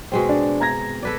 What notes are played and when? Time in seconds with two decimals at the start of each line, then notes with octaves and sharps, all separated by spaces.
0.12 B2 G#3 C4
0.29 D4
0.60 A#5 G#6 A#6
1.03 A4 B4 D5